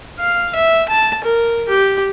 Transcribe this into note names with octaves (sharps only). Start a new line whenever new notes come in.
F5
E5
A5
A#4
G4